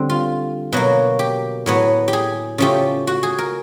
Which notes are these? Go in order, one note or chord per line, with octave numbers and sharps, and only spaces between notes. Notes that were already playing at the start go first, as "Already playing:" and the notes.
Already playing: D3 G3 C4
F4
B2 F#3 A#3 F#4
G4
A2 F#3 B3
G4
G#4
C#3 F3 A3 C#4 G4
F#4
G#4
A#4